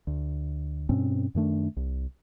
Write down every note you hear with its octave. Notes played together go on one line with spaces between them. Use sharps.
D2
G2 B2 C4 C#4
F#2 D#3 A3 D4
C2